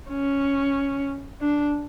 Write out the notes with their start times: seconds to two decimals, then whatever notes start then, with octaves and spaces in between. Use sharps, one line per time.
0.10 C#4
1.41 D4